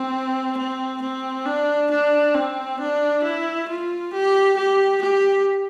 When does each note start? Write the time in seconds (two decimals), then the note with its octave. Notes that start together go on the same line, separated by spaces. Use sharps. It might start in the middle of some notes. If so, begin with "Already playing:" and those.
Already playing: C4
0.57 C4
1.02 C4
1.45 D4
1.90 D4
2.34 C4
2.80 D4
3.23 E4
3.68 F4
4.13 G4
4.57 G4
5.02 G4